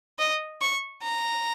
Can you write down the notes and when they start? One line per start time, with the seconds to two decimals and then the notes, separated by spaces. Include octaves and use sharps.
0.19 D#5
0.61 C#6
1.03 A#5